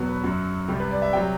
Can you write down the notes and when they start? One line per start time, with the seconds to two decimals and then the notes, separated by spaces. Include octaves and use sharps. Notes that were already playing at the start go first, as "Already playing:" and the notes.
Already playing: E2 B2 F#3 F#4
0.09 B4
0.23 F#2 F#3 F#4
0.68 C2 C3 G3 G4
0.80 B4
0.91 D5
1.02 E5
1.13 C3 F#3 G5